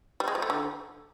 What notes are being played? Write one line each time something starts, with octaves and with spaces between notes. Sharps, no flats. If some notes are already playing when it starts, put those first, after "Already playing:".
G3
G#3
F3
A3
D3